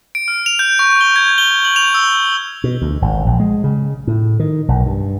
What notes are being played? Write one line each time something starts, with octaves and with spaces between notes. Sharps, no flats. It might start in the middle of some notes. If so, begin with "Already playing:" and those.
D7
F6
F7
G6
C#6
G7
G#6
G7
F#7
F7
E6
B2
D2
G#1
A#1
G#3
C#3
A2
D#3
B1
G2